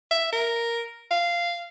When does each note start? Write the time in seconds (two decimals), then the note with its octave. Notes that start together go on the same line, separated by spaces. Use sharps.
0.11 E5
0.33 A#4
1.11 F5